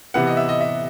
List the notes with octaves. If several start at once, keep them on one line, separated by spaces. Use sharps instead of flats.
C3 E3 B3 F#5
D#5
E5
D#5
E5